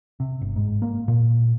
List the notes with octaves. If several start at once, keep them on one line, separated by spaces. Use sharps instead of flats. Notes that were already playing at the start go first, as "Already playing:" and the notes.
C3
G1
G#2
A#3
A#2